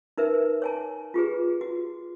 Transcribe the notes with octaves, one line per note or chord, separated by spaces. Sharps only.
D#4 A#4 B4 E5
C#5 G#5 A5
F4 G4 G#4 B4
F#4